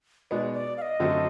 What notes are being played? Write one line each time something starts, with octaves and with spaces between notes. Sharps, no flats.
B2 G#3 B3 D#4 D5
D5
F5
D#5
F#2 D3 F#3 A3 C4